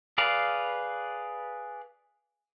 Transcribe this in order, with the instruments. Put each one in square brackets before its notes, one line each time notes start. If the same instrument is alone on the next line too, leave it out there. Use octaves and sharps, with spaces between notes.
[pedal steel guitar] G#4 B4 D5 F5